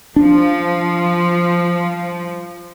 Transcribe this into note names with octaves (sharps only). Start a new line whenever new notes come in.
F3 D4